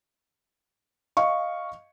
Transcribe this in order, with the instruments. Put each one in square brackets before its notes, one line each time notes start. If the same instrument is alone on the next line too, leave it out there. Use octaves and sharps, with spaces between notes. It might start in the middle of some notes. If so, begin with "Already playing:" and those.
[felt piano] D#5 F5 C#6